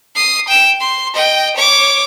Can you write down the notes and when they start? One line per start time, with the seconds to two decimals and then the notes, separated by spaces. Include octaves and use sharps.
0.16 D#6 C7
0.48 G5 E7
0.80 C6
1.14 D#5 G5
1.56 C#5 D6